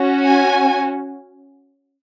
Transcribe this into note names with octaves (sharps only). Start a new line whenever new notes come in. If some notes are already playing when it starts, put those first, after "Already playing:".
Already playing: C#4 F#4
G#5